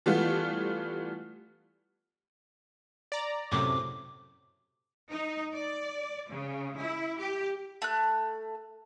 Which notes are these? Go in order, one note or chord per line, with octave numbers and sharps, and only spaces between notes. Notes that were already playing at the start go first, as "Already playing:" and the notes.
E3 G3 A3 B3 F4
D5 A#5
F#2 A2 C3 D6
D#4
D5
C#3
E4
G4
A3 F#6